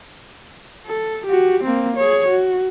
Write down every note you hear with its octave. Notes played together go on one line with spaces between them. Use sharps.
A4
F#4 G4
A#3 C4
G#4 C#5
F#4